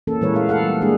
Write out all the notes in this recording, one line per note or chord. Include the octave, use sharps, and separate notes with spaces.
E3 A#3 C#4 A4
A#2 E3 G#3 A#4 B4 C#5
A3 C#5 F5
A4 F5 F#5
G3
G#3 A#3 D4 G#4 A4